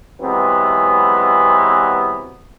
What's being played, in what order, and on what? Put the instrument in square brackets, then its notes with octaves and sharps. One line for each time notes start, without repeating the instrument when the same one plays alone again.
[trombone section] C3 E3 F#3 G#3 B3 C4